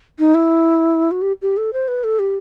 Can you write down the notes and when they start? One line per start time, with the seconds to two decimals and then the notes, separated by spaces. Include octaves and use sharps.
0.19 D#4
0.34 E4
1.11 F#4
1.22 G4
1.42 G4
1.57 A4
1.73 C5
1.88 B4
2.04 A4
2.19 G4